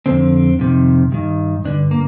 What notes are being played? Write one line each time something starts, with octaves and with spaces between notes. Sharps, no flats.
F2 D3 C4
F2 C3 D#3
G2 D#3
G2 D3 D4
A#3